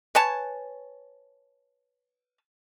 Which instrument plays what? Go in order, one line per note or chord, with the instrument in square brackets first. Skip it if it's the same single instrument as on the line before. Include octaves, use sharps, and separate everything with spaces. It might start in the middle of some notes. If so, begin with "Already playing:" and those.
[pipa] B4 C#5 G#5 A5